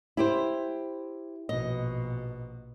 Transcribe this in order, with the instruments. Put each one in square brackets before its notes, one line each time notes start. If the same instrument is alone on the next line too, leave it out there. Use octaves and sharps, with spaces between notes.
[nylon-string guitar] E4 G4 C5
[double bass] A#1 B2 [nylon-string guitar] D#5